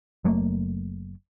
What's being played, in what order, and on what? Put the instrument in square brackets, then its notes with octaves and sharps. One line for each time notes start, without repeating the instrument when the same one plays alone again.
[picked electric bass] F#1 F#3 A3 A#3